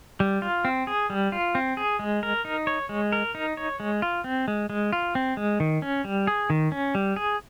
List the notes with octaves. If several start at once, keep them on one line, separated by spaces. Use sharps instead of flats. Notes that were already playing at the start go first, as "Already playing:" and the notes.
G3
F4
C4
G#4
G3
F4
C4
G#4
G#3
A#4
D#4
C#5
G#3
A#4
D#4
C#5
G#3
F4
C4
G#3
G#3
F4
C4
G#3
D#3
C#4
G3
G#4
D#3
C#4
G3
G#4